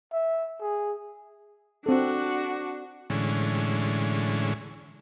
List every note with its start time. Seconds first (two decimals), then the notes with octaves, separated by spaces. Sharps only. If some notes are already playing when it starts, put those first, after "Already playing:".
0.13 E5
0.61 G#4
1.86 C4 D4 F#4 A4
3.10 A2 D3 E3 G#3 C#4